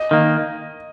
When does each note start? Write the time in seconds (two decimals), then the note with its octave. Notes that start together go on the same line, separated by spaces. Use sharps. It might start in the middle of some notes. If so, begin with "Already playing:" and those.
Already playing: D#5
0.11 D#3 A#3